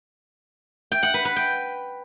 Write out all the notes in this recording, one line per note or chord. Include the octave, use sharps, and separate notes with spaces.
G5
F#5
B4
B4
G5